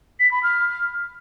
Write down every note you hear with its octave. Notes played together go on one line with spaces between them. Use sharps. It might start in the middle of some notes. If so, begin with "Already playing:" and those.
B6
B5
F6